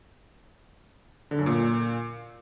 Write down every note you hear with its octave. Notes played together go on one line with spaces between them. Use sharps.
D3
F#2
A#2